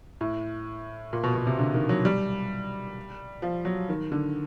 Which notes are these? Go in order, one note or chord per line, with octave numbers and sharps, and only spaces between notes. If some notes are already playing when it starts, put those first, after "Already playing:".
A2
A#2
B2
B2
C3
D3
D#3
F#3
G3
F3
F#3
D#3
D3